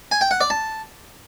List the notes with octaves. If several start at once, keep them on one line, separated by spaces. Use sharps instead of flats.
G#5
G5
F#5
D5
A5